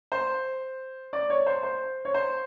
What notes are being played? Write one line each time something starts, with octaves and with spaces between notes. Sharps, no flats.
C5
D5
C#5
C5
C5
C#5
C5